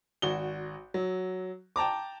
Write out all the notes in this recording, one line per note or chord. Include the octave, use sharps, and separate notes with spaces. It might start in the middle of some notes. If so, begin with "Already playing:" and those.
G#1 F#4 G7
F#3
G5 A5 A#5 D6